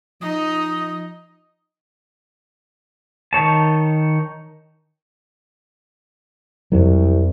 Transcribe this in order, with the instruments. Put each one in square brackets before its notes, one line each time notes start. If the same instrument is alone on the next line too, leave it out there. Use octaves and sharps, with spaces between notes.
[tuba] F3 [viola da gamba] D#4 D#5 [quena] D#6
[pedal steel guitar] D#3 D#4 C#5 A5
[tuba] C2 [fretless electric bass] F2 F#3